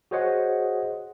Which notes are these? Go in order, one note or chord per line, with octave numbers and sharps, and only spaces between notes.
F#4 G#4 C5 C#5 D#5 F#5